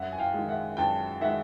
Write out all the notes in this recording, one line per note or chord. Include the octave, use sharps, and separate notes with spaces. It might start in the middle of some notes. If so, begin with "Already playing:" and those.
Already playing: F#2 E5 F#5
G#5
F5 G5
D#3 G#3
E5 F#5
F#2 G5 A5
D#3 G#3 E5 F#5